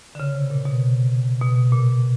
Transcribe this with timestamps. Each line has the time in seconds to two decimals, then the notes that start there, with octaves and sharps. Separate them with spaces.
0.15 D3
0.20 C#3
0.35 C3
0.50 A#2
0.65 B2
1.41 B2
1.72 A#2